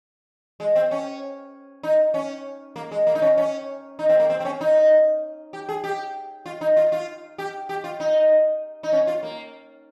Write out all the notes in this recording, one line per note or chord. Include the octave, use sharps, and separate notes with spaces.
G#3
C4
C#4
D#4
C#4
A#3
G#3
A#3
D#4
C#4
C#4
D#4
C4
A#3
C4
C4
C#4
D#4
G4
G#4
G4
F4
D#4
F4
F4
G4
G4
F4
D#4
D#4
C#4
F4
A#3